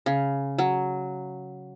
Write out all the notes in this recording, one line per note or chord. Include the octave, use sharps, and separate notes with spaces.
C#3
F#3